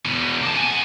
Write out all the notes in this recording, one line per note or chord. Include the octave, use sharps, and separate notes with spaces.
E2 B2
A#3 A5
B3 G#5